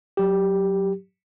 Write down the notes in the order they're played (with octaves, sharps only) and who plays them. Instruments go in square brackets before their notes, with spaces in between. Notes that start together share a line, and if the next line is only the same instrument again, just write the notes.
[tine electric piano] F#3 G4